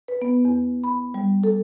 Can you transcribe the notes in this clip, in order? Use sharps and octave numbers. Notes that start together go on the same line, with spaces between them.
B4
B3
E2
B5
G3
A4